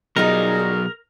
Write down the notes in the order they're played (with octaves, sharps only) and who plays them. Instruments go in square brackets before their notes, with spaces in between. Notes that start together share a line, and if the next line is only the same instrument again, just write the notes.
[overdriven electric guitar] B2 F#3 [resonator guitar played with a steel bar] G3 D#4 F4 [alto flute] G#4 [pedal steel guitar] A#4